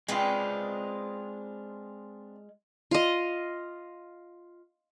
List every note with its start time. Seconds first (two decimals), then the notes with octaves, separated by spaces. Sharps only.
0.09 G#3 C4 D4 F4 B4
2.91 F4 D#5